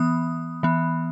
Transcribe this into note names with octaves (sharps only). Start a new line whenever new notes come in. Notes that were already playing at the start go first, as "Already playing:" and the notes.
Already playing: E3 B3 D#6
E3 B3